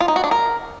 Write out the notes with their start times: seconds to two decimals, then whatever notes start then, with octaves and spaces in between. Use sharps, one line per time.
0.01 F4
0.08 D#4
0.16 F#4
0.24 D4
0.31 A#4